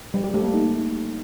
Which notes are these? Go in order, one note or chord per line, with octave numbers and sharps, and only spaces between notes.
G3
G4
A3
A#3
D#4